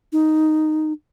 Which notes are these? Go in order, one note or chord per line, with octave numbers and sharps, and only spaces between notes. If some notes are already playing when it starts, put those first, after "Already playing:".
D#4